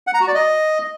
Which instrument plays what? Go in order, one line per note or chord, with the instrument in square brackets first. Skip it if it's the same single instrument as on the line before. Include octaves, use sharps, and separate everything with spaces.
[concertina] F#5
A#5
F#4
D5
D#5